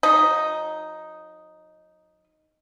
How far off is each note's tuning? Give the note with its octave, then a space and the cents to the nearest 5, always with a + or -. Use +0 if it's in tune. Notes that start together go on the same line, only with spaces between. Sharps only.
F#3 -45 D#4 +0